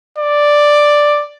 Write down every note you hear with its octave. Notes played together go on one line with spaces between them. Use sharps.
D5